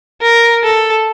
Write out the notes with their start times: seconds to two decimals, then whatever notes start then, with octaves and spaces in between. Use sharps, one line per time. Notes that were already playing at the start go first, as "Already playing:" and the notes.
0.21 A#4
0.63 A4